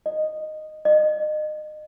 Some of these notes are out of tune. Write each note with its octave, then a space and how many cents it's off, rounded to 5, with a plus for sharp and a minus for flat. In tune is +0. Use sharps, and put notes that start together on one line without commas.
D#5 -10
D#5 -30